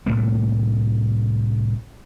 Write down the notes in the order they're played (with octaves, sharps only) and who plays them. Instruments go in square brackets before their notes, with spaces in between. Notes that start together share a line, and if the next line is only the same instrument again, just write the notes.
[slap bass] C2 A2 A3 A#3